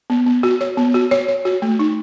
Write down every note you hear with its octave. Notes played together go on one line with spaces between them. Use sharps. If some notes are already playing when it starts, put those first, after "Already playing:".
B3
B3
F#4
C#5
B3
F#4
C#5
C#5
F#4
A3
D#4